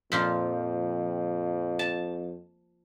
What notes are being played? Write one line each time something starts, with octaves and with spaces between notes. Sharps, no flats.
F2 A#2 F3 F4
A5